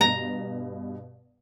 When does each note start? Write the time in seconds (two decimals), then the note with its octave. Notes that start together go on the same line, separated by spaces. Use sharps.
0.01 G2 B2 A#5